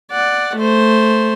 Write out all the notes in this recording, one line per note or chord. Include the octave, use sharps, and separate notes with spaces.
D5 F#5
A3 C5